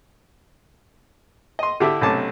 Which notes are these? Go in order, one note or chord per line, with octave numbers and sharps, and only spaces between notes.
D#5 C6
D3 D4 E4 G4 E5 E6
B1 C3 A3 C#4 A5 D6